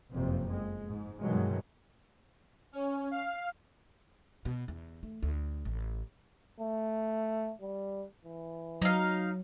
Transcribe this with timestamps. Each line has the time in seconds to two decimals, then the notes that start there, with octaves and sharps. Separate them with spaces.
0.13 F#1 F2 C3
0.51 G#3
0.86 G#2
1.20 G2 B2 D#3 E3 F#3 G#3
2.73 C#4
3.11 F5
4.45 B2
4.68 E2
5.03 A3
5.23 D2
5.65 A1
6.60 A3
7.61 G3
8.25 E3
8.82 F#3 D#4 F5